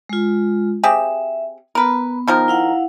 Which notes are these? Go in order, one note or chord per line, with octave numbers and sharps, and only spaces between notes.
G#3 F4
C4 G4 G#4 E5
B3 A#4 B4
D#3 F3 A#4
E4 F5 F#5